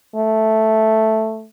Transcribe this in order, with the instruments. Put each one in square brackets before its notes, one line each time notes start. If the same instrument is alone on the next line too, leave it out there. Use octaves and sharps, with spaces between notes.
[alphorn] A3